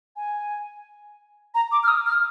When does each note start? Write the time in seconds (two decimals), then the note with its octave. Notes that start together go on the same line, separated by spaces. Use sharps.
0.16 G#5
1.55 A#5
1.72 D6
1.83 F6
1.88 D#6
2.06 F6